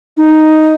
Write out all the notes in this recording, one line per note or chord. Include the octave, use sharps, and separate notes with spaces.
D#4